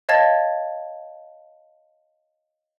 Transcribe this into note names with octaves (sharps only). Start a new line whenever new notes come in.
C#5 D#5 F5 A5 G#6 A6